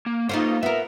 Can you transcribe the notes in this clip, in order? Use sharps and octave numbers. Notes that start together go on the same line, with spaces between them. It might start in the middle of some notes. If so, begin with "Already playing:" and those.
A#3
A#3 D#4 F4 A4 C5
B3 A#4 E5